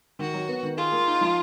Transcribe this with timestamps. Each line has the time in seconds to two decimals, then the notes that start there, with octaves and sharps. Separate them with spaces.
0.19 D#3 F#4
0.34 F#3
0.48 B3
0.63 D#3
0.77 F4 G#4
0.92 A#3
1.07 D#4
1.21 F3